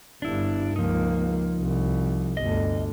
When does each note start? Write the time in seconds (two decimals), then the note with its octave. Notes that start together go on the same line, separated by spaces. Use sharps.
0.22 G1 G2 D4 E4
0.76 C#2 F3 A#3 D#4
1.60 C2
2.37 G1 D2 D#5